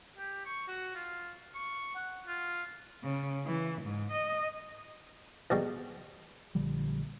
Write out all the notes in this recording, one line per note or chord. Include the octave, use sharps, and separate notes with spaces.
G4
C#6
F#4
F4
C#6
F#5
F4
C#3
E3
G#2
D#5
C2 B2 G3 G#3
A#1 D3 F3 G3